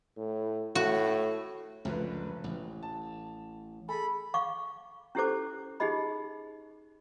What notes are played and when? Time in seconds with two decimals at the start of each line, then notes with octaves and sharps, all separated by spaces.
0.17 A2
0.75 A2 F#4
1.85 F1 C#2 F#2 D3 B4
2.44 A1
2.83 A5
3.89 G#4 A4 B5
4.34 F5 C#6 D6
5.15 C#4 E4 G4 A4 C5 D6
5.80 D#4 G4 G#4 D#5 B5